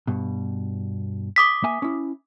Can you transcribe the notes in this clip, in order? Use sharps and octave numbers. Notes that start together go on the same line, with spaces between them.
G2 B2
D6 D#6 B6
A#3 E5 G#5
C#4 E4